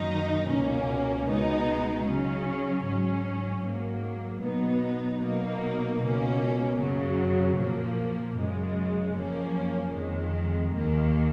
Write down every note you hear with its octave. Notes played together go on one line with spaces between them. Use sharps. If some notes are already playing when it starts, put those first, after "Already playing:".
Already playing: F#2 D#3 F#3 A#3 D#4
C#2 B2 A#3 C#4
C#2 B2 G#3 B3 D#4
C#3 F#3 C#4
G#2 F#3 C#4
G#2 F#3 A#3
B2 F#3 B3 D#4
B2 F#3 A#3 D#4
C#2 B2 A#3 C#4
F#2 C#3 F#3
A#2 F3 A#3
F#2 C#3 G#3
F#2 F3 A#3 C#4
F2 D#3 G#3
D#2 D#3 A#3